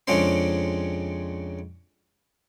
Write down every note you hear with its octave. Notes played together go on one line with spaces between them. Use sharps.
F2 C#3 G#3 C#4 D4 C6